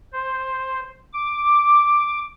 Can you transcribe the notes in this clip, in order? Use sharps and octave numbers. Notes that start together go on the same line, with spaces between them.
C5
D6